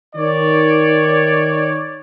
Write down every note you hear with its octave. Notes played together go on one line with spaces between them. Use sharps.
D#3 C#5 D5